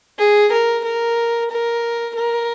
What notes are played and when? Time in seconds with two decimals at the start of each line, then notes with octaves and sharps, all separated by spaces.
0.18 G#4
0.52 A#4
0.84 A#4
1.50 A#4
2.15 A#4